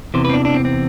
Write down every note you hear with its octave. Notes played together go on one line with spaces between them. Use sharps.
E2 C3 E3 C5
C4 B4
D4
D4
C4
C4